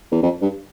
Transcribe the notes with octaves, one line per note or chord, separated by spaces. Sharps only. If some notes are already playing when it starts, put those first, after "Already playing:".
E2
F2
G2